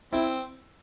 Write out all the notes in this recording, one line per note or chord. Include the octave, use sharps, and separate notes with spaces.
C4 E4